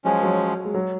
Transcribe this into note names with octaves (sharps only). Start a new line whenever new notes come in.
F3 F#3 G#3 C#4
F#3
G#3
F#3